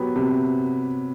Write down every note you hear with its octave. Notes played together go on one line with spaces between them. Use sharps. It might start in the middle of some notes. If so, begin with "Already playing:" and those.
Already playing: F#3 B3 G4
C3